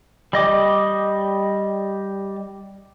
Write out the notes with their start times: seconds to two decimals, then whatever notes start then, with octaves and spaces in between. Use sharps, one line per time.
0.33 G3 D#5 D6